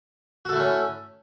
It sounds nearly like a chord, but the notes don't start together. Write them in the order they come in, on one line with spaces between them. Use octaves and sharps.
F#4 A4 A3 E4 C#4